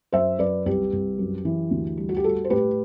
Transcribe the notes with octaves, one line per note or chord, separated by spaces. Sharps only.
F#2 C5 E5
F#2 B4 D5
C2 G4 B4
C2
F#2
E3
D2
G3
F#4
G4
G3 F#4 A4
C5
A2 G4 B4